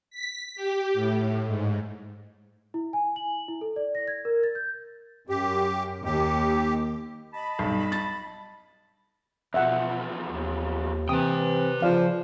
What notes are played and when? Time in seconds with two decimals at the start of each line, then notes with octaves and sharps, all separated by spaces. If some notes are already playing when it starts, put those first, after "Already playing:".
0.11 B6
0.56 G4
0.94 A2
1.47 G#2
2.74 E4
2.93 G#5
3.16 F#7
3.48 E4
3.61 A4
3.76 D5
3.95 A#6
4.08 G#6
4.25 A#4
4.43 A6
4.55 G6
5.29 F#2 G4
6.05 D#2 G4
7.34 D#5 A5 B5
7.59 B1 G2
7.92 A6
9.54 E2 B2 F3 E5 F#5
10.28 D#2
11.09 C3 E3 B4 G5 D#6
11.82 C#3 F3 D5 F5